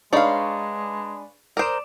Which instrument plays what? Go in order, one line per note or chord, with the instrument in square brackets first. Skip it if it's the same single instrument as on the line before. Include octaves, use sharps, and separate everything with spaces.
[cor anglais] G#3 [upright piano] D4 G#4 B4 [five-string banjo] D#4 D5 [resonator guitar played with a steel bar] C#5 F5
[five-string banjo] A#4 C5 [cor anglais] D5 [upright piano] D#6 D7 E7